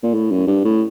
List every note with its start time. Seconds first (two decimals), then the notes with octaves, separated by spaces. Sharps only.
0.03 A#2
0.14 A2
0.31 F#2
0.47 G2
0.65 A2